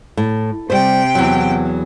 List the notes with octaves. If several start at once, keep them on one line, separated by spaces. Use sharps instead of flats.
A2
C3 G3 C5 G5
E2 F#3